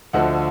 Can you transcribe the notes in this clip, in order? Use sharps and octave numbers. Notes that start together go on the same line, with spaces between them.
D2 D3 F3 D#5 F#5